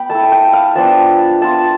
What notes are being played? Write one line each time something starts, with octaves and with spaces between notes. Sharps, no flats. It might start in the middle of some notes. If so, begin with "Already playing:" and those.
Already playing: B3 G5 B5
A3 E4 A5
A5
G5
F5
F3 B3 D4 A5
B3 F4 A5